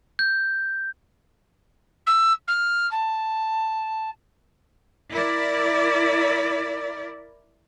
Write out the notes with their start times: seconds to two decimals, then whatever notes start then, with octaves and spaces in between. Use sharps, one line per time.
0.19 G6
2.06 E6
2.47 F6
2.91 A5
5.11 E4 A#4 D5